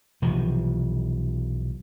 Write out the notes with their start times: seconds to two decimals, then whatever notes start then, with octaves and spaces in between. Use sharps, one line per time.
0.22 B1 C3 E3 F3